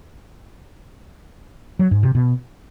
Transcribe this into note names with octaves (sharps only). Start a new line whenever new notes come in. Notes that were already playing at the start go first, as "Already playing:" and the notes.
F#3
G#2
C3
B2